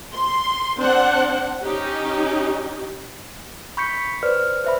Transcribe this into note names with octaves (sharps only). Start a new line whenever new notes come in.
C6
C4 D4 C5 F#5
C#4 D#4 G4
B5 C#6 G6 B6 C#7
B4 C5 D5 F6
C5 E5 B5